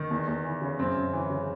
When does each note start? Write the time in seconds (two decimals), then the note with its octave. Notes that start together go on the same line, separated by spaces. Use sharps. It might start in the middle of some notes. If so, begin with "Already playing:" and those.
Already playing: D#3
0.11 E2
0.28 E2
0.45 E3
0.62 C#3
0.79 F#2 C4
0.96 F#2
1.13 E3
1.30 C#3